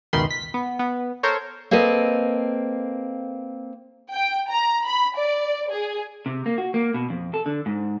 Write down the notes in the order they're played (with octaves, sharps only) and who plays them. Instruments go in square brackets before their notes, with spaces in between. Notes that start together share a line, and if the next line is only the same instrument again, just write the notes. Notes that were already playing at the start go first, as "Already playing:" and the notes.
[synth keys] C#2 F#2 B2 D#3 B5 C6
B6
B3
B3
A4 A#4 C5 C#5
[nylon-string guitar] A#3 C4 A4 B4 D#5
[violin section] G5
A#5
B5
D5
G#4
[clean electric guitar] C3
A#3
F#4
A#3
B2
F2
A4
D3
G#2